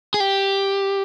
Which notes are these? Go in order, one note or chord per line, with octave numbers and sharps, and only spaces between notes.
G#4
G4